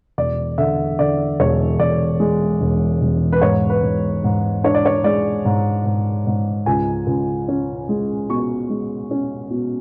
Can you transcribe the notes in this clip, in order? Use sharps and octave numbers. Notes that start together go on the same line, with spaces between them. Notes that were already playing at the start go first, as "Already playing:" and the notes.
E1 D5
D3 E5
D3 D5
E1 C#5
E1 D5
G#3
E1
E1
B4
G#2 C#5
B4
G#2
G#2
D4 C#5
D5
C#5
G#3 D5
G#2
G#2
G#2
C#2 G#5
C#2
C#4
G#3
B2 C#6
G#3
C#4
B2